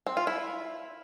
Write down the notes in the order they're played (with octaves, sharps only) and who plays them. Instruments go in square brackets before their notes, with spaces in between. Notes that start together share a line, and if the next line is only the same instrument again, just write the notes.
[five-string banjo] C4
F4
E4